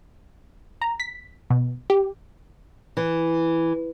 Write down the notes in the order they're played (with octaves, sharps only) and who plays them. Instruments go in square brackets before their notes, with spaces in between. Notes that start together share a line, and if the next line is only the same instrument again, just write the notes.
[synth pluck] A#5
B6
B2
G4
[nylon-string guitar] E3